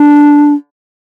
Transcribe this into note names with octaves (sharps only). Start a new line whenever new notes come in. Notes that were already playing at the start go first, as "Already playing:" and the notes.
Already playing: D4